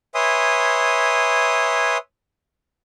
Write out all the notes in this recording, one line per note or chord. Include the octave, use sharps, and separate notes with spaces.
B4 C#5 E5 G#5 C6 D#6